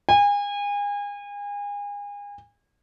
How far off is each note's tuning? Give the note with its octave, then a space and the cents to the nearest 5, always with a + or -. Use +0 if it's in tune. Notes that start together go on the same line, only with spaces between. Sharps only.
G#5 -35